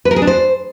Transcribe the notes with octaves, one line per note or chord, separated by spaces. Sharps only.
B4
A#4
G#4
D4
C5